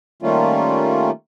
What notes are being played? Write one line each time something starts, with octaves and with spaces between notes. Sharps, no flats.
D#3 G3 A3 A#3 C#4 F4